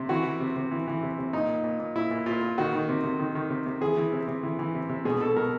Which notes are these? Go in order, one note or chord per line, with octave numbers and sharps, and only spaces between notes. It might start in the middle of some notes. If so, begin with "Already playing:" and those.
Already playing: C3
E3 F#4
E3
C3
C3
E3
E3
C3
C3
A#2 D#4
A#2
A#2
A#2
A#2 E4
A#2
A#2 F4
A#2
D#3 F#4
D#3
C3
C3
D#3
D#3
C3
C3
E3 G#4
E3
C3
C3
E3
E3
C3
C3
B2 G#4
B2 A4
B2 A#4